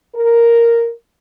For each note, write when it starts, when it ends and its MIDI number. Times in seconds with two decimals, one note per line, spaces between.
0.15 0.91 70